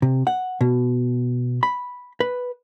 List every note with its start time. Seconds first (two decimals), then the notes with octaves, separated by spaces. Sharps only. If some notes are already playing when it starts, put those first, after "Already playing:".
0.02 C3
0.27 F#5
0.61 B2
1.63 B5
2.20 B4